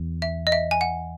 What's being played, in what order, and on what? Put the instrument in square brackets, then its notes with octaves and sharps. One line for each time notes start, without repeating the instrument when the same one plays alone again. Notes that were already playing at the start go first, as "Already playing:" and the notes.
Already playing: [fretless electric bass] E2
[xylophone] E5
D#5
E5
G#5
F#5